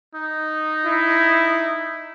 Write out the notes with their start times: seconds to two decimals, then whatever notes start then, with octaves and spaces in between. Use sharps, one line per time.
0.15 D#4
0.86 E4